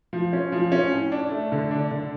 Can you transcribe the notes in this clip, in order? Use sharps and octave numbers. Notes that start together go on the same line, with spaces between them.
F3
C#4
F3
C#4
A2
D4
A3
D3
D4
D3